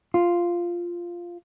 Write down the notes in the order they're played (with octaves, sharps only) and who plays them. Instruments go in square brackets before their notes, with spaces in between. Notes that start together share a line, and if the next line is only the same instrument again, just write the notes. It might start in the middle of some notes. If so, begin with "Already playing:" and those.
[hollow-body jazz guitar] F4